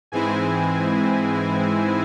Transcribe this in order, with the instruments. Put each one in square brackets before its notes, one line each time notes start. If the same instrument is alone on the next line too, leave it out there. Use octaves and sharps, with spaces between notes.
[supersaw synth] G#2 E3 G#3 C4 E4 G#5